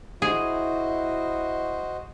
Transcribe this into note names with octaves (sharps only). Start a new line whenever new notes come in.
E4 F#4 G#4 C5 D#5